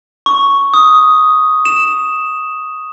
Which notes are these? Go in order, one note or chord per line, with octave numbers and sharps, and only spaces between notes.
C#6
D#6
E7